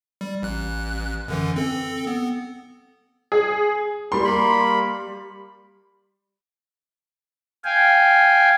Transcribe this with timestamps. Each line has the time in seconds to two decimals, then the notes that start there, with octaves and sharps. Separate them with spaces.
0.21 G3
0.43 A1 F#6
1.28 F#2 D3 E3
1.56 C4 A4
2.07 B3
3.32 G#4
4.12 G3 C6
4.25 A#3 B5
7.65 F5 G5 G#5